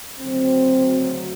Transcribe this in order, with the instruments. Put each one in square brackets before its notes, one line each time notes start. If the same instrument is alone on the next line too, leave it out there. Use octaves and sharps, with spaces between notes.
[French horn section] D2 C#3 F#3 C4